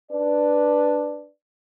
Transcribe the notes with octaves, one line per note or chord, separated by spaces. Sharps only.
D4 B4 D5